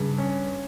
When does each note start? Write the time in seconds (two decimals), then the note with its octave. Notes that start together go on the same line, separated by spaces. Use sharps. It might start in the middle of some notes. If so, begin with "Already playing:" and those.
Already playing: G2 C#3
0.18 C#4